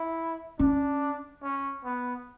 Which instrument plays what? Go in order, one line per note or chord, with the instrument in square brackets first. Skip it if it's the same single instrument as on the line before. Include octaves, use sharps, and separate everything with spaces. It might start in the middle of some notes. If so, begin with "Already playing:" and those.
Already playing: [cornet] E4
[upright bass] C#4 [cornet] D4
[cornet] C#4
B3